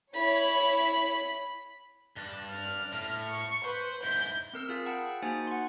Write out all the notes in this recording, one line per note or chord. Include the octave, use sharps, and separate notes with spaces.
E4 C#5 B5
G2 D4
F6
A2
C#6
B4 C5
G#2 E4 G6
C4 A#4 E6
F4 G#4 F5
F#5 G5 A5 B5
A#3 D#4 F#4 C5 G#5 A6
F#5 G#5 C6